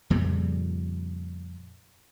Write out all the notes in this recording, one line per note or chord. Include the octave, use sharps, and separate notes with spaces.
F2 A#2 C#3 G3